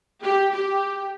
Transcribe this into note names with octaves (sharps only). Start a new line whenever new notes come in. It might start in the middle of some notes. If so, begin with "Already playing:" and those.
G4
G4